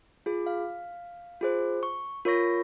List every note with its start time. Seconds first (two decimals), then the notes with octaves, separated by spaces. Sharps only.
0.26 F4 G#4
0.46 F5
1.41 F4 G#4 C5
1.83 C#6
2.25 F4 A#4 C#5 C#6 A#6